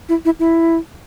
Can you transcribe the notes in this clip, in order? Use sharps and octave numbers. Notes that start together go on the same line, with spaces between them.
E4
E4
E4